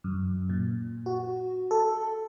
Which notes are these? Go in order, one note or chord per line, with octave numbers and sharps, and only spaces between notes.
F#2
A#2
F#4
A4